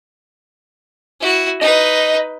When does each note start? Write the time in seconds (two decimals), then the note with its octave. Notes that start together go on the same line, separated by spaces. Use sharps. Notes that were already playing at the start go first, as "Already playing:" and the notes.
1.20 E4 F#4
1.61 D#4 B4 D#5